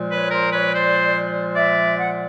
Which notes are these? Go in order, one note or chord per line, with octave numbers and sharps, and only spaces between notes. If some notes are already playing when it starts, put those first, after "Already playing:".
Already playing: A#2 F3 G#3
B4 C#5
A#4 C5
B4 C#5
C5 D5
D5 E5
F#5